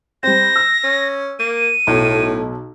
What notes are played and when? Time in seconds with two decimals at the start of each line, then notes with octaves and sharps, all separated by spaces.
0.23 G3 C4 C5 A#6
0.56 E6
0.84 C#4
1.39 A#3 D#7
1.87 B1 A2